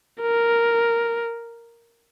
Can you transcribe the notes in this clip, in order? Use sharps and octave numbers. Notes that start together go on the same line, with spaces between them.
A#4